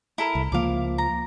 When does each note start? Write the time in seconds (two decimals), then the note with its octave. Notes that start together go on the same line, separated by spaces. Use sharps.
0.18 E4 A4 A#4
0.35 C2
0.52 C#2 F3 A#3 F5 D6
0.98 A#5